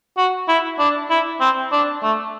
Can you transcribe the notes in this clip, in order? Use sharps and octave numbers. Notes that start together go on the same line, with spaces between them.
F#4
E4
D4
E4
C4
D4
A3